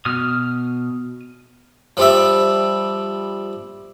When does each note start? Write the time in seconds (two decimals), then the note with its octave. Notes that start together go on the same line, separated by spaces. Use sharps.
0.05 B2 D#6 F6
1.97 F3 G3 E5